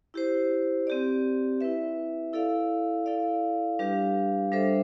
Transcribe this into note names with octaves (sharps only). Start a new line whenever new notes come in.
E4 G4 C5
C4 G4 D5
E4 B4 E5
E4 A4 D5 F5
E4 A4 D5 F5
G3 D4 G4 B4 F5
G3 D4 A4 C5 E5